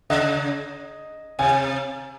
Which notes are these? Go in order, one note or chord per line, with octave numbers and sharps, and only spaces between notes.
C#3 D#5
C3 G#5